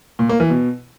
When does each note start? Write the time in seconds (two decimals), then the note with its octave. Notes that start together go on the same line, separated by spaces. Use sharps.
0.19 A#2
0.29 A#3
0.40 E3
0.50 B2